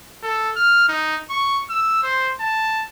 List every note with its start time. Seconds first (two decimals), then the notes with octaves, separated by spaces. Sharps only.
0.23 A4
0.56 F6
0.89 D#4
1.30 C#6
1.70 E6
2.03 C5
2.40 A5